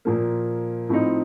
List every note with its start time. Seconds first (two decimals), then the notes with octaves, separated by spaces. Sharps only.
0.05 A#2 F3 A#3
0.89 A2 F3 C4 D#4